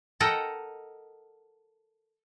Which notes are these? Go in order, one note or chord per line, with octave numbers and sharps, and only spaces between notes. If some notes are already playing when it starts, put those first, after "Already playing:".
A4 A#4 D#5 F#5 G5 A#5